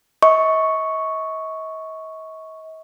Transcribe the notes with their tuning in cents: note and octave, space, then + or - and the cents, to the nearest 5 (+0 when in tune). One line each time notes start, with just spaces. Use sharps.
D#5 +45 C#6 +0